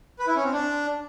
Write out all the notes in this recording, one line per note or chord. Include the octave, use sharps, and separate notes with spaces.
B4
E4
C#4
C4
D4